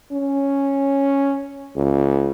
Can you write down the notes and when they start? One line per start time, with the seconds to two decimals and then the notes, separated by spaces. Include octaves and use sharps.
0.12 C#4
1.76 C#2